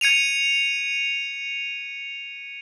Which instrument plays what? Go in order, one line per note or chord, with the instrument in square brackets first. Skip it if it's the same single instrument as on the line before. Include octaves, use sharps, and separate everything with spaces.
[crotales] G#6 C#7 D#7 F7